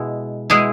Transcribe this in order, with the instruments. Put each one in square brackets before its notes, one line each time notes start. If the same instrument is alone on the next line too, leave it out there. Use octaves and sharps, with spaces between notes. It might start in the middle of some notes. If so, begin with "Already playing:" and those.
Already playing: [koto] B2 G#3 E4
B2 G#3 E4 G#4